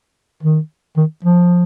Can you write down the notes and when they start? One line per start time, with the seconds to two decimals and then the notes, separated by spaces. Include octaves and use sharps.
0.43 D#3
0.97 D#3
1.24 F3